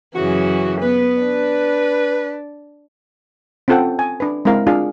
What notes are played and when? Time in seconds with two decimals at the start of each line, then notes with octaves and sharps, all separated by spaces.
0.15 F#2 C#3 E3 F#4
0.82 B3 B4
1.22 D4
3.68 C4 C#4 F4 A4 F#5 G5
3.99 G#5
4.20 D4 B4
4.45 G#3 C4 E4 A#4 F5
4.67 D4 F4 G#4 F5